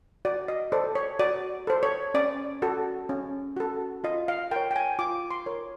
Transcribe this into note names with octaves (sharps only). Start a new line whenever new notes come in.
F#4 D5
D#5
A4 C5 D5
C#5
F#4 D5
A4 C5
C#5
C#4 D5
F#4 A4
C#4
F#4 A4
F4 D#5
F5
A#4 C#5 G5
G5
G#5
F4 D6
C6
A#4 C#5